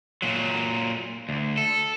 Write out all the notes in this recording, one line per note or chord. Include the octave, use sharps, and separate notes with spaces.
A#2 F#3
D2
A4